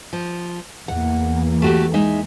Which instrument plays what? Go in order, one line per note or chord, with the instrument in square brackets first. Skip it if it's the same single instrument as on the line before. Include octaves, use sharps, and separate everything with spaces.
[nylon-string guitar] F3
[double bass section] E2 E3 A#3 [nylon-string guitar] F#5
[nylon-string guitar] A3 F#4 G4
G#3 D#4 E5